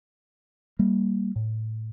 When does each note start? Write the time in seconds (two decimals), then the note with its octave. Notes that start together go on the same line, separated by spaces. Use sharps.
0.79 G3 A#3
1.36 A2